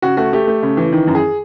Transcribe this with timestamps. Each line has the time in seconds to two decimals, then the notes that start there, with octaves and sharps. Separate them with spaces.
0.02 C#3 F#4
0.17 A3 F#4
0.33 A3 G4
0.47 A3
0.63 C#3
0.77 E3
0.93 D#3
1.07 F#2
1.15 G#4